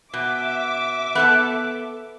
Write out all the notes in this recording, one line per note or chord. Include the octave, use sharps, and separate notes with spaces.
B2 E5 D6
B3 A4 A5